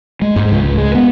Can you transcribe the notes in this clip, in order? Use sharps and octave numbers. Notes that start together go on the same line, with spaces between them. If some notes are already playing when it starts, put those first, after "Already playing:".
G#3
G#2
C#2
G#3
B3